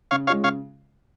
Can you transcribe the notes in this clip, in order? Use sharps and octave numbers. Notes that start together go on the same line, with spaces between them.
C#3 C#5 F5
G#3 C#4 F4 C#5 F5
C#3 C#5 F5